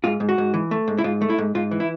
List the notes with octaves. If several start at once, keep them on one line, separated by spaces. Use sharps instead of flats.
G#2 F4
G#2
F#4
G#2
E3
A3
G#2
E4
G#2 F4
A3
E4
G#2
G#2 F4
E3
E4